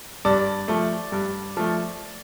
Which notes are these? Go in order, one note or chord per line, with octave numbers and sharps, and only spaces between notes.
G2 D5
F3 A3
G2
F3 A3